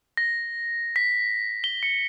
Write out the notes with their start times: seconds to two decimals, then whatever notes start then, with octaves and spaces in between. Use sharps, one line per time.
0.17 A#6
0.96 B6
1.64 G7
1.83 C#7